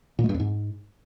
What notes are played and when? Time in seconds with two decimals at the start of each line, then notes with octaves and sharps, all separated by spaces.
0.19 A#2
0.24 G#3
0.29 G2
0.34 F2
0.40 G#2